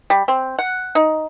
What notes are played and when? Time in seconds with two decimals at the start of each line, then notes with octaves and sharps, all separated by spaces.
0.10 G3
0.28 C4
0.59 F#5
0.95 D#4